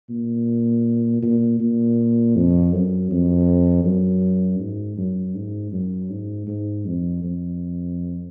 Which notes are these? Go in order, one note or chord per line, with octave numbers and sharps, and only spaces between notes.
A#2
A#2
A#2
F2
F#2
F2
F#2
G#2
F#2
G#2
F#2
G#2
G#2
F2
F2